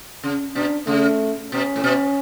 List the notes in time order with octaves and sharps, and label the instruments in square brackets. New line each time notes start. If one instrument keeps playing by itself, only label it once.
[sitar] C#3
[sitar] B2 [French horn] D4
[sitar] C#3 [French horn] A3
[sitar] B2 [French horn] C#4
[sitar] A2
B2